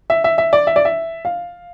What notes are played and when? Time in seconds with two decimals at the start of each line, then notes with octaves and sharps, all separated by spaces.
0.10 E5
0.24 E5
0.38 E5
0.53 D5
0.67 E5
0.76 D5
0.85 E5
1.25 F5